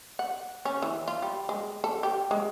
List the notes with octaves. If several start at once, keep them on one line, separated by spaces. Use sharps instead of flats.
F#5
C#4
E3
F4
G3
G#3
A4
G4
G#3